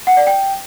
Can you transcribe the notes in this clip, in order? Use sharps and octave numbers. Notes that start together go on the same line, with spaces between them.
F#5
D5
G5